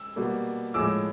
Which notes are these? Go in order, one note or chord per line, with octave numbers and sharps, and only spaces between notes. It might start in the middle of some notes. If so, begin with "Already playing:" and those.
Already playing: E6
B2 G3 A#3
A2 F3 G#3 D6 E6